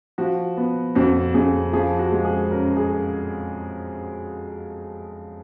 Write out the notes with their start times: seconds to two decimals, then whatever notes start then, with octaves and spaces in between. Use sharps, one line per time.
0.18 F3 F#4
0.57 B3
0.95 F2 F#4
1.34 F2 G#4
1.73 F3 G#4
1.99 F#4
2.12 G#3
2.25 G#4
2.51 F#2 A#4
2.77 G#4